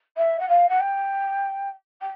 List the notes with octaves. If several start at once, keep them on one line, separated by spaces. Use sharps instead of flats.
E5
F#5
F5
F#5
G5
G5